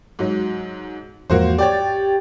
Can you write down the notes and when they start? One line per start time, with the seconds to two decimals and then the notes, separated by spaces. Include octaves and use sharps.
0.19 G#2 F#3
1.30 E2 G#2 F3 A#3 F#4 C5
1.58 G4 C#5 D5 G5 A6